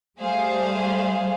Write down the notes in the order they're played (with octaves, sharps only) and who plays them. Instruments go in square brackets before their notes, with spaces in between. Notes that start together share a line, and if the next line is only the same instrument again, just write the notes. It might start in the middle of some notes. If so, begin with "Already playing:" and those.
[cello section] G3 A3 [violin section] G#4 C5 F5